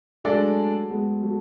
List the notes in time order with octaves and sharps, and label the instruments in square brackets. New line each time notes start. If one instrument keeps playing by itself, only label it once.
[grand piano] F#3 A3 [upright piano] G#3 D4 A4 D5
[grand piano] G#3 B3
F#3 A3